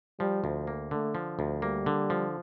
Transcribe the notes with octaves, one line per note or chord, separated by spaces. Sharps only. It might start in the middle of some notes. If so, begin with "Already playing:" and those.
F3 G3
D2
A#3
D3 A3
F3
D2
G3 A#3
D3
F3